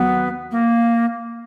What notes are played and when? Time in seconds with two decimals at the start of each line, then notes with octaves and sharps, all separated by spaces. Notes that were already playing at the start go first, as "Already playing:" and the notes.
Already playing: D#2 D#3 F#3 B3 F#4
0.51 A#3